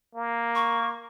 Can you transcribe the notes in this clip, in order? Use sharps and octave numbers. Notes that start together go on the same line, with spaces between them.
A#3
C#6